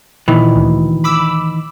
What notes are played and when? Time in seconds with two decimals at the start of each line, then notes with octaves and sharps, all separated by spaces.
0.28 A#2 D#3 E3
0.56 D2
1.04 B5 D6 E6